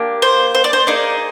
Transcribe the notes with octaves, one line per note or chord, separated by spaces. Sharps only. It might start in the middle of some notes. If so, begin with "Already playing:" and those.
Already playing: A#3 D4 G4
C5
C5
D5
C5
A#3 D#4 G#4 D5